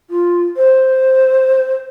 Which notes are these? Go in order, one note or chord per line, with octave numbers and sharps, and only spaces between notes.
F4
C5